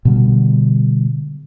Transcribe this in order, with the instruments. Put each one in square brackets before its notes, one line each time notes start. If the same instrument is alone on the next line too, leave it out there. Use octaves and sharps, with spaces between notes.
[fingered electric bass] B2 D3 G3